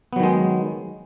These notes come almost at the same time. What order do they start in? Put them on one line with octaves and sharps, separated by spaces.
B3 F#3 D#3 G#3